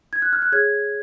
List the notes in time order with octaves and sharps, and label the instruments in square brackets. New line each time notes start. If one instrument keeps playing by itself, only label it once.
[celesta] G#6
F#6
F6
F#6
G#4 C#5 G#6